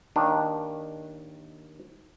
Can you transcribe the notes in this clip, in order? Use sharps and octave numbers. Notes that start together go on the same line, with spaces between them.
D#2 D#3 D4